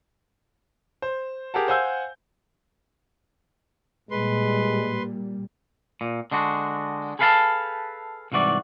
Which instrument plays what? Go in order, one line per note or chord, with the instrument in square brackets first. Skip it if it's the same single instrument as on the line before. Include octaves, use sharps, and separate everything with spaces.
[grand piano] C5
G4 G#4 A#4 F#5 A5
C5 F5 F#5 G#5 E6 G6
[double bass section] A#2 G3 [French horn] G#3 [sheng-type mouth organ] B4 C6
[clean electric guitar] A#2
D3 G#3 D4 F#4
G#4 A4 B4 F5 F#5 A5
C2 G#2 E3 F#4 D5